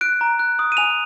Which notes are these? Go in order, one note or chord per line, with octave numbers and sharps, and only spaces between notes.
F#6 D7
A#5
F#6
D#6
D#7
G#5 F7